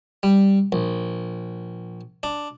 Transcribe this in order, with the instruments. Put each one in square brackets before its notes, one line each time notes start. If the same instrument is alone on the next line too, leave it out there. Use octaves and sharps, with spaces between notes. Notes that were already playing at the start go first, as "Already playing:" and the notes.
[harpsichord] G3
A#1
D4